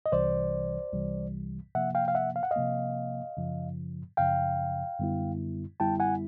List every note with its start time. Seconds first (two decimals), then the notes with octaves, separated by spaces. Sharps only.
0.06 D#5
0.12 C2 C3 E3 G3 C5 D5
0.93 C2 C3 E3 G3
1.75 C3 F3 A#3 E5 F#5
1.95 F5 G5
2.08 F5
2.15 E5 F#5
2.36 F5
2.43 F#5
2.51 D#5 F5
2.56 C3 F3 A#3
3.37 F#2 C#3 F3
4.17 F#2 C#3 F3 F5 G5
4.99 F#2 D3 G3 B3 E4
5.80 F#2 D3 G3 B3 E4 G5 A5
6.00 F#5 G#5